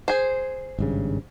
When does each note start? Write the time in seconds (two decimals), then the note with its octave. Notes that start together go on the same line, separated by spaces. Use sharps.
0.08 G#4 C5
0.79 G#1 G2 C#3